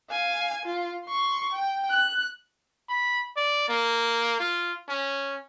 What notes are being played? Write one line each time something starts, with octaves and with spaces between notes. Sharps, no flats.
F5 G#5
F4
C6 C#6
G5
F#6
B5
D5
A#3
F4
C#4